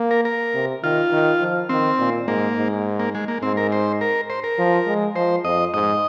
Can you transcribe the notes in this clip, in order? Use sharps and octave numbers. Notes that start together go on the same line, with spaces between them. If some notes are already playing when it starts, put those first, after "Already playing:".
Already playing: A#3
A#4
A#4
C3
D#3 F4
D#3
F3
D#3 C4
A#2
G#2 A#3
G#2
A#3
G#3
A#3
G#2 C4
A#4
C5
A#4
C5
A#4
F3
G#3
F3 C5
F2 D#5
G#2 D#5